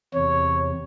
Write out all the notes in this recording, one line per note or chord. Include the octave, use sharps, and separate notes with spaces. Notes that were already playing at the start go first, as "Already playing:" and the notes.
E2 C3 C#5